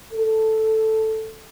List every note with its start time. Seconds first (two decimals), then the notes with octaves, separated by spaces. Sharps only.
0.13 A4